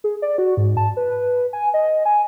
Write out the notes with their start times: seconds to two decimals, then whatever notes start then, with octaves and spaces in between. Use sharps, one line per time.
0.04 G#4
0.22 D5
0.38 F#4
0.57 G#2
0.77 A5
0.97 B4
1.53 G#5
1.74 D#5
2.05 G#5